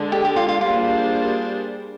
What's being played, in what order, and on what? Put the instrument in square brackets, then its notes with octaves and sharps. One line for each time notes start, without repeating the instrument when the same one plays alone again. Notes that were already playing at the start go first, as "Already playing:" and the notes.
Already playing: [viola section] D3 G#3 D4
[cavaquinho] G4
G4
F4
F4
[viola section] G3 A#3 D4 G#4 C5 [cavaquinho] F4